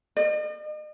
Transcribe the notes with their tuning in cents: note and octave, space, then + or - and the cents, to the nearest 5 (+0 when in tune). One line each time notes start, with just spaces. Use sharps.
D#5 -45